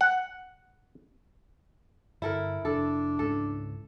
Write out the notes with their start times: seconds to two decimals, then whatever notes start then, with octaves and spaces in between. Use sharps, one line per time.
0.01 F#5
2.22 G1 E4 A4 A#4
2.65 F1 D4 A4
3.19 C#2 G#2 C#4 A4